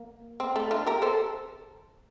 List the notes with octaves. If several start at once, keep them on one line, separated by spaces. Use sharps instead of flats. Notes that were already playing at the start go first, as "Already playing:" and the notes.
Already playing: A#3
C4
A3
D4 F4
G4 A#4
A4 C5